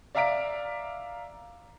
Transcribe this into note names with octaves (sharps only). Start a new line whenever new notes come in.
D5 E5 F5 A#5 B6 D7